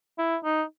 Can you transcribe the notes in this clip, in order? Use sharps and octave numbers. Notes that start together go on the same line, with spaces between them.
E4
D#4